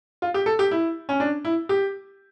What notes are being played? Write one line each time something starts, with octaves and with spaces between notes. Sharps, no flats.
F4
G4
A4
G4
E4
C#4
D4
E4
G4